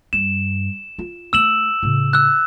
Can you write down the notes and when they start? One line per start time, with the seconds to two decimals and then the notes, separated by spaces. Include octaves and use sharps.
0.13 G2 E7
0.98 F4
1.33 A3 E6 E7 F#7
1.83 A2 C#3
2.13 E6 F#6